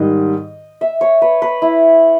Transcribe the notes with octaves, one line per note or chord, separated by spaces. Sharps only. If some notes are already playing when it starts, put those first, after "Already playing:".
Already playing: G#2 D#3 G3 D#5
E5
C#5
B4
B4
E4